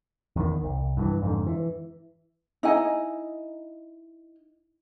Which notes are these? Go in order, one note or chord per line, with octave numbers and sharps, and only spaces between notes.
E2 D#3
C2
G2 D3 E3
F2 G#2 D3
E3
D#4 E4 D#5 G#5